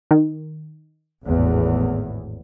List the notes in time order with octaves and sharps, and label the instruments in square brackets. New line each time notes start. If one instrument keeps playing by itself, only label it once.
[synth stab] D#3
[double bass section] G#1 E2 A2